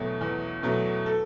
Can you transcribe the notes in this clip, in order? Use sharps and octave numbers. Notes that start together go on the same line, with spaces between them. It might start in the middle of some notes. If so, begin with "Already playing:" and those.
Already playing: E2 B2 F#3 A3
E2
B2 F#3 A3
A4